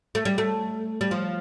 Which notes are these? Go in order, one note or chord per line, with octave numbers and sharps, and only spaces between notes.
A3
G3
A3
G3
F3